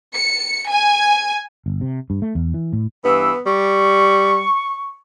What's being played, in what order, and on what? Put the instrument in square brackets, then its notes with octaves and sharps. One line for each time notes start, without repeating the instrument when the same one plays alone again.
[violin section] C#7
G#5
[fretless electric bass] G1
C3
G2
A3
E2
E3
A2
[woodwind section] G2 E3 E6 [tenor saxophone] B3
[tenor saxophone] G3 [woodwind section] C#6